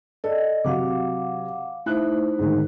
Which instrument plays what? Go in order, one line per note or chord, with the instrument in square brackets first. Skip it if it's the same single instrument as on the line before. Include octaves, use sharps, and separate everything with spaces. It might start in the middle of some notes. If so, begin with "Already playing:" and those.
[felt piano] A4 [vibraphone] D5 D#5
[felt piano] C3 F#3 [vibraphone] F5 F#5 D6
[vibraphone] A3 D#4 C5 [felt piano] E4 F#6
[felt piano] G#2 D3 D#3